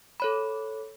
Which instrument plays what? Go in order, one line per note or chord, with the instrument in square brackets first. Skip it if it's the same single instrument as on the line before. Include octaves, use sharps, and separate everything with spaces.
[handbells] A4 C#5 B5